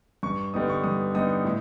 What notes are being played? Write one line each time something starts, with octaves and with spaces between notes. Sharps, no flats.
G2 C#6
D3 G3 B3 D#4 D#6
C#6
G2 D#6
D3 G3 B3 D#4 D#6
A2